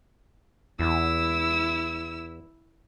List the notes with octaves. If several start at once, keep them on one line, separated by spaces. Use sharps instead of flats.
E2 E4 E6